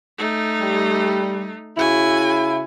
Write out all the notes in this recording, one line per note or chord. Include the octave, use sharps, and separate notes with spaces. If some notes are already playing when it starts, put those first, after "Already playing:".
A3 D#4
G3
C#3 E4 F#4 G#5